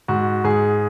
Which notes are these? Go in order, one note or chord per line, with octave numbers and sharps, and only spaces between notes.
G#2 F#4
G#2 G#4